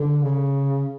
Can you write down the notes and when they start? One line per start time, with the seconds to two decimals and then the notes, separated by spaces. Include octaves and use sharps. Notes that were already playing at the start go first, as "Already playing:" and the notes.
Already playing: D3
0.22 C#3